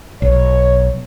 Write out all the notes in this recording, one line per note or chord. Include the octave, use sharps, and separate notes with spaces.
B1 C#5